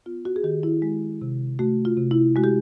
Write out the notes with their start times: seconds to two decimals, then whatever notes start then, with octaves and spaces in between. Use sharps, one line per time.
0.06 B3 F4
0.25 F#4
0.36 G#4
0.44 D#3 G4
0.63 E4
0.82 G#3
1.22 C3
1.59 A3 F#4
1.85 F4
1.97 C3
2.11 E4
2.36 G#3 F#4
2.44 G4